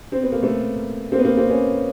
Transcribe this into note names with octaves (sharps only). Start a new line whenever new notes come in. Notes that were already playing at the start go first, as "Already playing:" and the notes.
C4
B3
A#3
A3 B3
A#3 C4
B3
A#3 C4
A#3 C4
B3 C#4